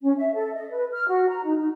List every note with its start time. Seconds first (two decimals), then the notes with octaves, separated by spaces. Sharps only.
0.03 C#4
0.17 E5
0.34 A4
0.54 D#5
0.70 B4
0.92 F6
1.08 F#4
1.29 A#5
1.45 D#4
1.56 D#4